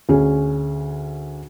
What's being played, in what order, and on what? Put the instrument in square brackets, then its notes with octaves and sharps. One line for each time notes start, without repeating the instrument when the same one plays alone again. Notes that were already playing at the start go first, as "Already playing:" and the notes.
[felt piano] D2 C#4 G#4